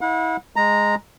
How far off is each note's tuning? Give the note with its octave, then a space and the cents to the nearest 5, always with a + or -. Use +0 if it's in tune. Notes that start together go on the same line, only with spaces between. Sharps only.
E4 -30 F#5 -40
G#3 -5 A#5 +0